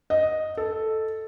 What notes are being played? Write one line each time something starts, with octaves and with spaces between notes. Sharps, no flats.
D#5
A4